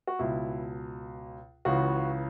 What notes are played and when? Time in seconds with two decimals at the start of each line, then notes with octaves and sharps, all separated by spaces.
0.07 F#4
0.19 C#2 B2 E4
1.65 C#2 C#3 E3 F#4